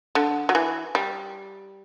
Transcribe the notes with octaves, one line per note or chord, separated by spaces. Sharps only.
D3
F#3
E3
G3